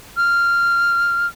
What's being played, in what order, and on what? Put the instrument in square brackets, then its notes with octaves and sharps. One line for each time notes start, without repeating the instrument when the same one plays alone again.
[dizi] F6